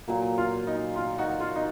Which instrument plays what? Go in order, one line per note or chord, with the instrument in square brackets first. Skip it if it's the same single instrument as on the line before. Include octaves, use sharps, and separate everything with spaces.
[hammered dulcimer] A#2 F#3 A#3
[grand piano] F4
D#4
F4
D#4 F#4
F4
D#4